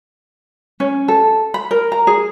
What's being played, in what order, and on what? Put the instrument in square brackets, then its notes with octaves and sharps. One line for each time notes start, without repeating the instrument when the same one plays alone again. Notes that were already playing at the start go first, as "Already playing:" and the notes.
[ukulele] C#4
A4
B5
A#4
A#5
G#4